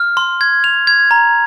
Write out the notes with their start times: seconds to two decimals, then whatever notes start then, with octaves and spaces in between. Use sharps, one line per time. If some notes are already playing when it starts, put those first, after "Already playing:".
Already playing: F6
0.17 C6
0.41 G#6
0.64 F7
0.87 G#6
1.11 A#5